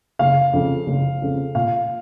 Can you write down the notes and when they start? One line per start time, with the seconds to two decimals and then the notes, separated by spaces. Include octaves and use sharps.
0.19 F#1 F5
0.53 F2 C#3 F3
0.87 F#1
1.22 F2 C#3 F3
1.55 A#2 F5